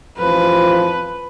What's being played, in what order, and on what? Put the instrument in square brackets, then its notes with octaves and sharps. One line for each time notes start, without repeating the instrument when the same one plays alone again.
[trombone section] A1 F2 F3 [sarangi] B4